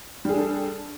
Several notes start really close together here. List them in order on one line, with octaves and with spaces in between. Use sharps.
G3 G#4 D4 A4